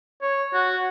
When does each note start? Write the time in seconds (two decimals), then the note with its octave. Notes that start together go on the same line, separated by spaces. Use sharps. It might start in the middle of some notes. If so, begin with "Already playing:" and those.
0.22 C#5
0.54 F#4